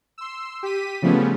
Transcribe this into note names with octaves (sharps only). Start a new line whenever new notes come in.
C6 E6
G4 B6 D#7
C#3 F3 G3 A3 B3 C#4